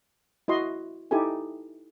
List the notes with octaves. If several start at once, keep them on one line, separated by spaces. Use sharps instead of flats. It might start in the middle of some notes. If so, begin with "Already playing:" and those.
E4 F#4 D#5 C6
D#4 E4 G4 A4 G#5